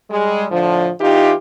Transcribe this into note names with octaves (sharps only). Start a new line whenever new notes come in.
G3 G#3
A2 D3 F3
E3 D#4 F4 G4